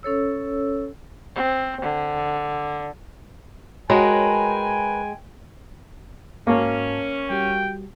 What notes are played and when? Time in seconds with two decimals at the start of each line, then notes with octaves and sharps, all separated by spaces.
0.03 C#4 A4 C#5 E6
1.35 C4
1.82 D3
3.90 G#3 F#4 A#4 B4 C#5 G5 G#5
6.47 G#2 A#3 C#4 F#4 A5
7.30 G3 F#4 G4 G5